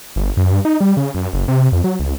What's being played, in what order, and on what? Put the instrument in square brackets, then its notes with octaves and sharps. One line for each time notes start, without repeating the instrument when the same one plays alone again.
[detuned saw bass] G1
F#2
G2
D#4
G3
C#3
F#2
F#1
C3
F2
F#3
C#2